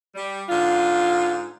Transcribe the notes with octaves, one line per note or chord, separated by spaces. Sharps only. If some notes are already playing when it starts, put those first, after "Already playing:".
G3
G#2 D3 F4